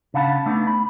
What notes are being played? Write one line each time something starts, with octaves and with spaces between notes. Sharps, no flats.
C#3 D4 F5 F#5 A5 B5
A3 B3 D4 D#4
B5